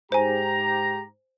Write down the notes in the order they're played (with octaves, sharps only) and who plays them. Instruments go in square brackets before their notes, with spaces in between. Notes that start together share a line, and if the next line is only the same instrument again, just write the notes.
[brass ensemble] G#2 G4 A#5 [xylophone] C5 G#5